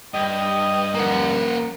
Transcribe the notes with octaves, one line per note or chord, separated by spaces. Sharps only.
G2 D#5 G5
F3 A#3 F#5